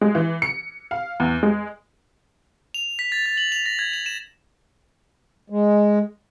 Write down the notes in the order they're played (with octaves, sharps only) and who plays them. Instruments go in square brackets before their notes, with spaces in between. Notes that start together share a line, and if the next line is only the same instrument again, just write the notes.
[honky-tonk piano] G#3
E3
C#7
F5
E2
G#3
[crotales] F7
B6
A6
A6
F#7
F7
A#6
G#6
F7
E7
[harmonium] G#3